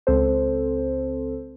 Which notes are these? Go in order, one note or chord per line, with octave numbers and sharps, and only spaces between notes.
C#2 C4 A4 C5